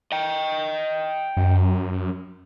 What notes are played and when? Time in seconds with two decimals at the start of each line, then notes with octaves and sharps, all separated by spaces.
0.12 D#5 G5
1.37 F#2